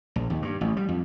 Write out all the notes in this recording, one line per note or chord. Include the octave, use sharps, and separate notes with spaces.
A#1
D#2
G2
A1
G3
F2